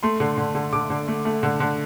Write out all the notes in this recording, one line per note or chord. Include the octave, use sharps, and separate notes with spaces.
A3 C6
D3
D3
D3
D3 D6
D3
A3
A3
D3
D3